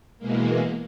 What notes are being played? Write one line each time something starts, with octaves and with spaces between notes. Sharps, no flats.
B2 E3 G#3 A#3